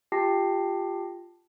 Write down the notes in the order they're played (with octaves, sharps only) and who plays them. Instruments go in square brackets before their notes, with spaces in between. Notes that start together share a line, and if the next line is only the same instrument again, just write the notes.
[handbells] F4 G4 G5 A5 A#6 C7